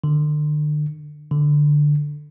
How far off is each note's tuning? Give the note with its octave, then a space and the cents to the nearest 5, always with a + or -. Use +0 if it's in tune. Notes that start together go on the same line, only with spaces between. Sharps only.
D3 +35
D3 +5